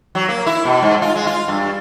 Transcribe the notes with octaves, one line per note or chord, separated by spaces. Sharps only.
F#3
A#3
E4
B2
G#2
F4
G#3
F4
G2